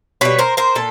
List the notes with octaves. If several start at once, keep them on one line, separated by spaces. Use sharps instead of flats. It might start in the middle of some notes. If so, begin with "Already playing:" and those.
B2 G3 B4 C#5
A#4 C5
A#4 C5
A#2 A4